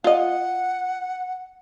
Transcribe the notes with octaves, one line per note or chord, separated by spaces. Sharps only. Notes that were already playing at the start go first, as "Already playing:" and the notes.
F4 D#5 F#5